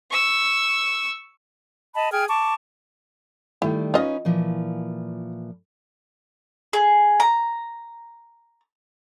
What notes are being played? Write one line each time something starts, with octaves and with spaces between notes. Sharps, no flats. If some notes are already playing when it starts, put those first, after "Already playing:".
C#6 E6
D#5 A5 B5
G#4 G5 F6 G#6
A5 C#6 D6
D#3 G3 A3 E4
C#4 D#4 F4 B4 D#5
A#2 E3 F3
G#4
A#5